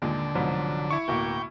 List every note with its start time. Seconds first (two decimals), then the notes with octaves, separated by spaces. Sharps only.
0.02 D#2 A#2 D3 G#3
0.35 C2 G#2 B2 F3 F#3
0.91 E4 C#6
1.08 D1 B2 A#3 G5